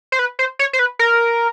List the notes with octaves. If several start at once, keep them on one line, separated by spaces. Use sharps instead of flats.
C5
B4
C5
C#5
C5
B4
A#4